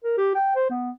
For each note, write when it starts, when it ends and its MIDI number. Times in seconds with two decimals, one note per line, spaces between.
0.04 0.16 70
0.18 0.31 67
0.35 0.50 79
0.56 0.67 72
0.70 0.91 59